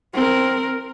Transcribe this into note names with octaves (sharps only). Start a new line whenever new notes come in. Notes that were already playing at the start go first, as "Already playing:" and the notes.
C4 A#4